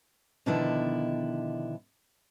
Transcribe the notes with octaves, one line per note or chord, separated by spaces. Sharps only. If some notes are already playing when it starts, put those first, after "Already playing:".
B2 D3 D#3 F3 D4 E4